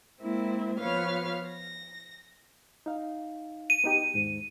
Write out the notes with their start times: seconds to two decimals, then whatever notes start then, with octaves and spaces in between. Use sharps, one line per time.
0.21 G#3 A#3 C4 E4
0.79 F3 B3 B4 C#5 F5 F6
1.49 A#6
2.86 D#4 F5
3.70 D#7
3.84 B3 D#4 G4
4.14 D#2 G#2